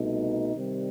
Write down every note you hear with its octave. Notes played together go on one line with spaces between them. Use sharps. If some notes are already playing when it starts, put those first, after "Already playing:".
Already playing: C2 B2 A3 D#4
C3 D#3 G3